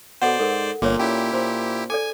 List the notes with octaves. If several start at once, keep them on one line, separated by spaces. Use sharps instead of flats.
B2 A4 C5 D5 F#5
G#2 A4 A#4
G1 A#2 A#3 G#4 C#5
C#4 E4 G4
A#2 C5
G#4 A4 D5 G#5